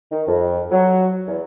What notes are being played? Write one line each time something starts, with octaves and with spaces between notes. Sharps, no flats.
D#3
F2
F#3
E2